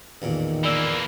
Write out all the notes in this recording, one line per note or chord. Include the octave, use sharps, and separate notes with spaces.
A1 E2 A#2 D#3
E3 A#3 A#4 D5 E6